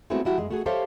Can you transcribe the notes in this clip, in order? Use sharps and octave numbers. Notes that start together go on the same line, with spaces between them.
G#3 A3 B3 C4 E4 F#4
F3 G#3 E4 F#4 G4
F#2 G#3
A3 F#4 G#4
G4 A4 C5 C#5 E5 F5